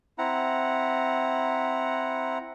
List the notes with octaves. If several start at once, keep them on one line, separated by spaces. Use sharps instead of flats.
C4 E4 F#5 A#5